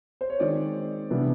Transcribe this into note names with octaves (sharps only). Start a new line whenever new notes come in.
C5
C#5
D#3 G#3 C4 D5
C3 E3 G3 B3 D4